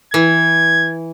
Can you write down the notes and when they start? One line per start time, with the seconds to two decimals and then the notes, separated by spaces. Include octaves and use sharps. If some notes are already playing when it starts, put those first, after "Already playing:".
0.14 E3 G#6